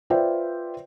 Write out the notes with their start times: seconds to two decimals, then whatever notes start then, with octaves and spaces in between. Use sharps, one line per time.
0.10 F4 B4 C5 D5 E5 G5